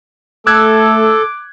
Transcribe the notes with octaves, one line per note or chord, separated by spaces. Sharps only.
A3 A4 D6 E6 F#6 G#6